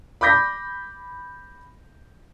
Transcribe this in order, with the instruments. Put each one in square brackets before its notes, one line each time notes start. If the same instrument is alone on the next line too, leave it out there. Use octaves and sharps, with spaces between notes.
[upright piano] B5 D6 G6 A#6 B6